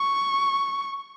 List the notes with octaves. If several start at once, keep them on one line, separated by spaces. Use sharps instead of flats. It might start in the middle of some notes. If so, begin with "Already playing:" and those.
Already playing: C#6